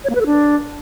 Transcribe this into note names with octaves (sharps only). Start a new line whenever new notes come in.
C#5
A#3
B4
A4
D4